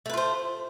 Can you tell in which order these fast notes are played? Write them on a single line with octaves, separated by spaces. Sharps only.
A3 B4 F4 C5